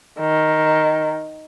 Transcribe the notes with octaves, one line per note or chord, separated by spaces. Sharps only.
D#3